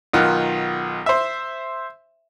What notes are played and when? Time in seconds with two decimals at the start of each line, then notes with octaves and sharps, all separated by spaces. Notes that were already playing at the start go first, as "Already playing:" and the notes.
0.13 B1 D#3 F4 F#5
1.06 C5 E5